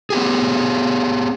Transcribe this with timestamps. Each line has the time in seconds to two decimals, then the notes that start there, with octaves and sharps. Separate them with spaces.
0.10 B3 G4 G#4